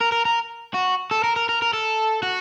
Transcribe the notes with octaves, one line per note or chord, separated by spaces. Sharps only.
A#4
A#4
A#4
F#4
A4
A#4
A#4
A#4
A#4
A4
F#4